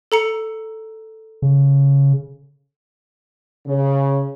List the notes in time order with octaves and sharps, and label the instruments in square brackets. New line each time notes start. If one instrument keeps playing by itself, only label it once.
[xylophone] A4 A#5 C#7
[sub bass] C#3
[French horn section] C#3